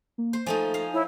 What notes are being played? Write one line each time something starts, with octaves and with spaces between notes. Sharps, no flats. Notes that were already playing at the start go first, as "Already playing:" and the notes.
A#3
C5
F3 A3 D#4 G#5
F5 A#5
E4 C#5